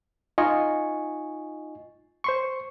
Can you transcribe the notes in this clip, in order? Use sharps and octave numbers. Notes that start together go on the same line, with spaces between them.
D#4 F4 D#5 G#5 C#6
C5 C6 C#6